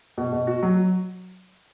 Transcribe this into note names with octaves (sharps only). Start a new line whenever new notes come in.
B2
B2
F#4
F#3